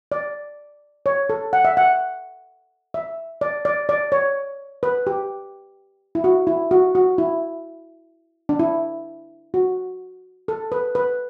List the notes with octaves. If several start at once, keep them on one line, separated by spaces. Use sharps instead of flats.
D5
C#5
A4
F#5
E5
F#5
E5
D5
D5
D5
C#5
B4
G4
E4
F#4
E4
F#4
F#4
E4
D4
E4
F#4
A4
B4
B4